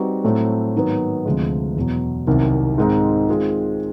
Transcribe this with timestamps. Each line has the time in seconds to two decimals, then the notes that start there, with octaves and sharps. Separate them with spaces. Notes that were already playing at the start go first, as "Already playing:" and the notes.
Already playing: G3 C4 D#4 F#4 B4
0.24 A2 F#3 A3 C4
0.75 G#2 D#3 F#3 B3
1.25 D2 C3 F3 G#3
1.76 E2 B2 F#3
2.27 C2 C3 D#3 F#3
2.78 G#2 D#3 G#3 C4 D#4
3.29 D#3 G#3 C4 F4 G#4